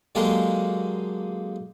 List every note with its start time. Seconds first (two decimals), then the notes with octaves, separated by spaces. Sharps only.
0.15 D3 F#3 G#3 A#3 G4 A#4